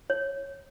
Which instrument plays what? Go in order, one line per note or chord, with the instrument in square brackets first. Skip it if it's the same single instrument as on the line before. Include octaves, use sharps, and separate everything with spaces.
[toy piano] C#5